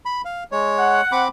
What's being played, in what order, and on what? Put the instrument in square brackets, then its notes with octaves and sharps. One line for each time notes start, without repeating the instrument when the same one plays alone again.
[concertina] B5
F5
G#3 C#5
[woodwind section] F#5
[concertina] C4 B5 D6